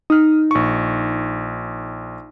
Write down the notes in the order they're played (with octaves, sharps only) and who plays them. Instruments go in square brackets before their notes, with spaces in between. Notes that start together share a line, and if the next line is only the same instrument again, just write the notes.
[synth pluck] D#4 [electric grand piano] D#6 F6
[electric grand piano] A#1 C#6